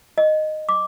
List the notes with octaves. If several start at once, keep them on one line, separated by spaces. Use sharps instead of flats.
D#5
D6